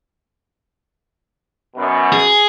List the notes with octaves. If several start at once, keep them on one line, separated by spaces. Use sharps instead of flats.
F#2 B2
G#4